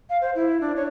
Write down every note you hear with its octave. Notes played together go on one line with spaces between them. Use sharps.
F5
C5
E4
D4
C#5